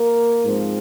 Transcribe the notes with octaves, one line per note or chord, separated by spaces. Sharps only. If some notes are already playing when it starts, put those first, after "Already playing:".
Already playing: A#3 A#4
G#2 F3 C4